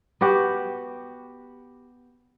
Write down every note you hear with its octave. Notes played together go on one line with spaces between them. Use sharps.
B3 F#4 G4